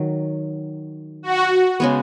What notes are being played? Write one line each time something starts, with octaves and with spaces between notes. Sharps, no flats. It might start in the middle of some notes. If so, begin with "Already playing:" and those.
Already playing: D#3 F#3
F#4
C#3 G#3 B3